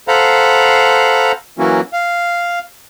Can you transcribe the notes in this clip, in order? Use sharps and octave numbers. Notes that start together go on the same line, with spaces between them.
A4 C5 F5 F#5 A#5 B5
E3 F#3 A#3 C#4 E4 F#4
F5